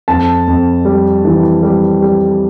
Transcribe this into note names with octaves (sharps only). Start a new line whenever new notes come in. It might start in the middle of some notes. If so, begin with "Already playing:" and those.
F2 A5
F2
G3
E3
G3
G3